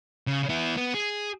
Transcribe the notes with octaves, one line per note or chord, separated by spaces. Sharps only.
C#3
B3 E4
B3
G#4